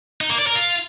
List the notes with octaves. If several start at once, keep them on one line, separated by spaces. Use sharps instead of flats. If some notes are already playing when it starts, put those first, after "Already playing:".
D#4
A#3
D5
A#4
F4